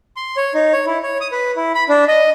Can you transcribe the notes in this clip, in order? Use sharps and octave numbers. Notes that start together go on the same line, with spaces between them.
C6
C#5
D#4
C#5
E4
C#5
D#6
B4
E4
B5
D4
D#5